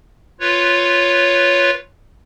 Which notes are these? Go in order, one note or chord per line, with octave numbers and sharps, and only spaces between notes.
F4 B4 C#5